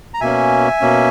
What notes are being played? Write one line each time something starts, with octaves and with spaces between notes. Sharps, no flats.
A#5
B2 A#3 C#4 E5 G#5
B2 A#3 C#4